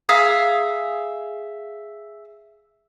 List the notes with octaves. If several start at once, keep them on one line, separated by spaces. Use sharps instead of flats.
G#4 E5 F5 A#5